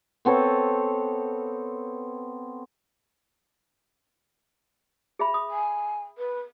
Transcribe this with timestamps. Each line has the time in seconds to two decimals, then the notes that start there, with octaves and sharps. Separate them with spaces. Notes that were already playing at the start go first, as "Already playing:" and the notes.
0.25 B3 C4 A4 C#5
5.19 G#4 E5 B5
5.34 D#6
5.50 G#5
6.18 B4